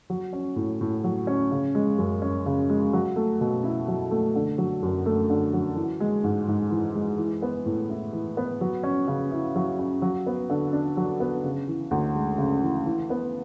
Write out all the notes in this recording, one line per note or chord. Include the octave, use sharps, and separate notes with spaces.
F#3
C#4
A2
A2
F#3
C#4
C#3
G#3
F#2
C#4
C#3
G#3
F#3
A3
B2
E4
F#3
A3
D3
F#3
F#2
A3
D3
F#3
E3
G#3
G#2
G#2
E3
G#3
E3
B3
A2
E4
E3
B3
F#3
C#4
C#3
E4
F#3
C#4
F#3
B3
D3
D4
F#3
B3
C#3
E3
D2
G#3
C#3
E3
E3
B3